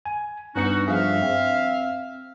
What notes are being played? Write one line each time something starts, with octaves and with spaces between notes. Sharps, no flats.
G#5
G2 B3 C#4 D#4 F#4 C#7
G2 F3 G#4 E5 F5
C4